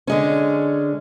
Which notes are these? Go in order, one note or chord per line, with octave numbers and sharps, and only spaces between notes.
D3 G#3 C#4